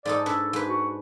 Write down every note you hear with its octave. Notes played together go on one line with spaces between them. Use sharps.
G#2 D#4 A4 D5
D4 A4 B4 C#5
G#2 B4
F#4